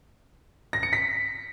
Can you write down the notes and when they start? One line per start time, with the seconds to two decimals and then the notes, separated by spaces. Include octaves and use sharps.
0.73 A#6
0.83 C#7
0.93 B6